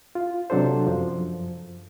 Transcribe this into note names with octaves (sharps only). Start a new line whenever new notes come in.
F4
C3 F#3 D4 A4 C5
F#2 F3